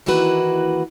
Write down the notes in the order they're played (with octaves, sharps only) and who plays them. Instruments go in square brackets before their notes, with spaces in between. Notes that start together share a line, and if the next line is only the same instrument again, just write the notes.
[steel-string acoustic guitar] D#3 E3 A#3 E4 F#4 B4